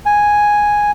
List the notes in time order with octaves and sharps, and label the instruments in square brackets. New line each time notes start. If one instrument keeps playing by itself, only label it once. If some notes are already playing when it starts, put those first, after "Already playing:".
[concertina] G#5